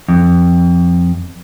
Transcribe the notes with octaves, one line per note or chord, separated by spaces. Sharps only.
F2